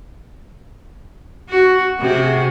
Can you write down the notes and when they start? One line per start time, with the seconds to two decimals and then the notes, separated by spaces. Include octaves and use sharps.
1.50 F#4
2.01 C3 F#4 G#4